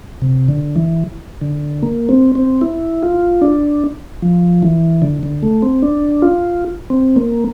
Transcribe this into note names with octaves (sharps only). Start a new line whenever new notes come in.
C3
D3
E3
D3
A#3
C4
C4
E4
F4
D4
F3
E3
D3
D3
A3
C4
D4
F4
C4
A#3